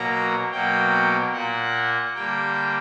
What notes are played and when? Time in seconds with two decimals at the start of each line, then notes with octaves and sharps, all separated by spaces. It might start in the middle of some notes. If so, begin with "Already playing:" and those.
Already playing: B2 F#3 A#3 A#5
0.52 B2 F#3 A#3 G5
1.32 A#2 A#3 F#5
2.14 D3 G3 A#3 G5